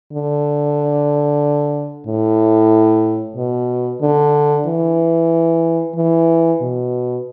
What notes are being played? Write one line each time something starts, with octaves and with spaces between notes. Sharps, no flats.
D3
A2
B2
D3
E3
E3
B2